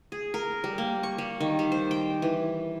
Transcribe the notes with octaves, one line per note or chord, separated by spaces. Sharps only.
G#4
A#4
G3
A#3
C#6
G3
D#3
G3
C5
G5
E3